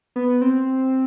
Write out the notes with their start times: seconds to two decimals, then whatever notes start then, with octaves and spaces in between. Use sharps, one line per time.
0.16 B3
0.42 C4